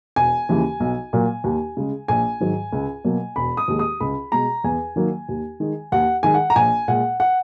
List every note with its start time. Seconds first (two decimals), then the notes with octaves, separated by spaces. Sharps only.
0.16 E1 G#5
0.49 D#2 C#3 E3
0.80 B1
1.13 A#2 F#3 A#3
1.44 D#2
1.77 C#3 G#3
2.08 A#1 G#5
2.40 G#2 D#3 F#3
2.73 C#2
3.04 B2 F#3 A#3
3.36 E1 B5
3.57 D#6
3.68 D#2 D#3 G#3
3.79 D#6
4.00 C#2 B5
4.32 B2 G#3 A#5
4.64 E2 G#5
4.96 D#3 F#3 A#3
5.29 D#2
5.60 D#3 G#3
5.92 D#2 F#5
6.23 D#3 G#3 G#5
6.34 F#5
6.50 A#5
6.56 A#1 G#5
6.88 A#2 G#3 F#5
7.20 F#5